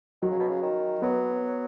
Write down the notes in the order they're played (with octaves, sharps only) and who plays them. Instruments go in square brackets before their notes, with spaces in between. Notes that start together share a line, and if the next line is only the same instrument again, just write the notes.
[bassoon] D#3 [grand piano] F#3
[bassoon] C#3
B2
C#3
D#3
[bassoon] F#3 [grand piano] B3